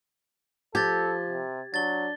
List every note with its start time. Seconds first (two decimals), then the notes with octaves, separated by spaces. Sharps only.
0.75 F3 G4 A4 G#6 A6
1.29 C3
1.74 F#3 D4 A6 G7